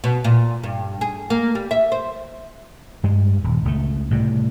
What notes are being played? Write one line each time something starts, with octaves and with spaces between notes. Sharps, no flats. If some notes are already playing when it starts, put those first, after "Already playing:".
B2
A#2
G2
G#4
A#3
G3
E5
C5
G2 G3 G#3
D#1
C#2 A3
A2 C3 G3